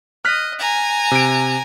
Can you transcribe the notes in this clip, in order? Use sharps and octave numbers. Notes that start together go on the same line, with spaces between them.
D#5 F6 F#6 B6
G#5 A#5
C3 D7